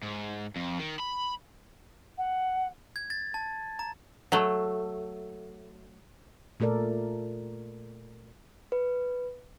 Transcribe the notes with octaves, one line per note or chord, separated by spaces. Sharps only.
G#2
F2
D#3
B5
F#5
G#6
A6
A5
A#5
F#3 A3
A#2 A3 A4 A#4 D5
B4